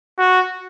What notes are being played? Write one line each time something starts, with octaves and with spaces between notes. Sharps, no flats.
F#4